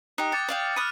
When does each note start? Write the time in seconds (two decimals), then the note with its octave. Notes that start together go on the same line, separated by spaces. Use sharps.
0.18 D#4 G4 D#6 F#6
0.32 G5 D6 A6 C#7
0.49 D5 F5 G5
0.76 B5 D#6 F6 F#6 D#7